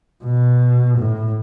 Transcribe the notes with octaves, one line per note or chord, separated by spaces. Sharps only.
B2
A2